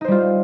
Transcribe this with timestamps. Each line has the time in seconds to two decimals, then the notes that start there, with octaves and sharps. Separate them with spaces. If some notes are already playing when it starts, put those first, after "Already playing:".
0.01 D#4
0.04 C5
0.08 G3
0.11 F4